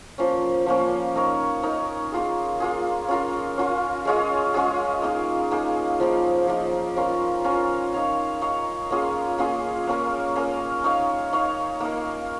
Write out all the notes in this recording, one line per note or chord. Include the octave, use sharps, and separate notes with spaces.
F3 A#3 C#4
F3 A#3 C#4
D#4 A#4 C#5
D#4 A#4 C#5
A#3 F4 G#4
A#3 F4 G#4
C#4 F4 A#4
C#4 F4 A#4
G#3 C#4 F4 G#4
G#3 C#4 F4 G#4
A#3 D#4 G#4
A#3 D#4 G#4
F3 A#3 D#4
F3 A#3 D#4
C#4 F4 A#4
C#4 F4 A#4
D#4 C#5 F5
D#4 C#5 F5
A#3 C#4 F4 G#4
A#3 C#4 F4 G#4
A#3 C#4 A#4
A#3 C#4 A#4
D#4 C#5 F5
D#4 C#5 F5
A#3 D#4 A#4